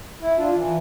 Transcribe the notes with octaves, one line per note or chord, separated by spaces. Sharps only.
E4
D4 F4
E3